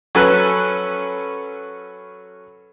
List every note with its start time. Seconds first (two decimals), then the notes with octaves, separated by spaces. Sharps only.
0.15 F#3 C#4 A4 B4 B5 F#6